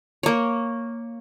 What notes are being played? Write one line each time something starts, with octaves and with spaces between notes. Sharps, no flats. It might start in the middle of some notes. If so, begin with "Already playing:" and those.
A#3 C#5